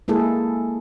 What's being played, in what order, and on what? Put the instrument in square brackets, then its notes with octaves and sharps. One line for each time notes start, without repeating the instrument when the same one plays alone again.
[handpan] G#3 A#3 E4 G#4 A4